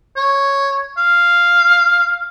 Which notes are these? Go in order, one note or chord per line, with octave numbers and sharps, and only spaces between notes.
C#5
F5